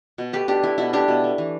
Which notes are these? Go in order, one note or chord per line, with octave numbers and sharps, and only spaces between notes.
B2
A3 G4 B4
B2 D4 G4
A3 E4
B2 E4
A3 D4 G4
B2
A3
E3